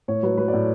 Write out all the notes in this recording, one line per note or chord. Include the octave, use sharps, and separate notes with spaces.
A2 C#5
F#3 B4
F#3 B4
D5
A2